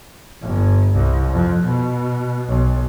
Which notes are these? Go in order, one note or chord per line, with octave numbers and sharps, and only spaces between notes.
G1
C2
F2
B2
B1